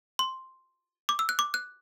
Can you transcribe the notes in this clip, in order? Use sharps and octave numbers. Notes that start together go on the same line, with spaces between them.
C6
D6
E6
F#6
D6
F#6